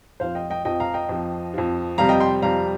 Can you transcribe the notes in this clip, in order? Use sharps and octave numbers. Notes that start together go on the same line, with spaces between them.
F2 F3 C5 F5
D#5 G5
D#5 G5
F2 F3 D#5 G5
F5 A#5
D#5 G5
F2 F3
F2 F3
F2 C3 G3 F5 A#5
D#5 G5
G5 C6
F2 C3 G3 F5 A#5